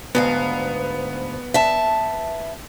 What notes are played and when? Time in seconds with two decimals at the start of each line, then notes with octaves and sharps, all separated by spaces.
0.15 D2 G#2 B3 F5
1.54 E5 A5